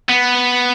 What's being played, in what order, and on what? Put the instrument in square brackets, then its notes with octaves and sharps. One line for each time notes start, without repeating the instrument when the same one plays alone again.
[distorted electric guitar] B3